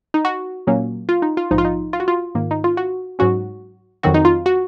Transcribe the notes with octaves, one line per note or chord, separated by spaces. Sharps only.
D#4
F#4
A#2 F#3 A#3 C#4
F4
D#4
F4
A#1 G#2 F3 D#4
F4
D#4
F4
F#4
F4
G#2 D#3 A#3
D#4
F4
F#4
G#2 F#3 C#4 F#4
F2 D#3 F#3 C4 F#4
D#4
F4
F#4